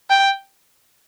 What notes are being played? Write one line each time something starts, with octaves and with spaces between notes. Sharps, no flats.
G5